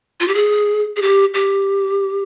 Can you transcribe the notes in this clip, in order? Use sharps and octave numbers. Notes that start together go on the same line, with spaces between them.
F4
G4
G#4
G#4
G4
G4